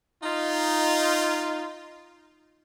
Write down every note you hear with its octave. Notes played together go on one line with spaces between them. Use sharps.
D#4 F4